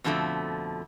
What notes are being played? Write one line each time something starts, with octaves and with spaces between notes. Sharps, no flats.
F2 B2 D3 F3 A3